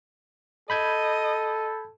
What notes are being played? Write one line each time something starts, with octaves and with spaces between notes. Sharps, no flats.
A4 D#5 B5 G6 G#6